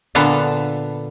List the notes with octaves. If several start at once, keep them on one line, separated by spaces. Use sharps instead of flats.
A#2 D3 B3 A4 F5